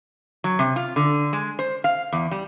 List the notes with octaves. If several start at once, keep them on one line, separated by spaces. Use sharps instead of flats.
F#3
C3
F4
D3
G#3
C5
F5
E2
G3